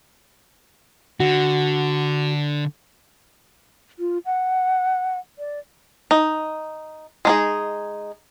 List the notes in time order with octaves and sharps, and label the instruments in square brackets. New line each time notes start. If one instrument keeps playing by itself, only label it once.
[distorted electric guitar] D3 [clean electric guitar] F#4
[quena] F4
F#5
D5
[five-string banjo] D#4
G#3 D#4 G#4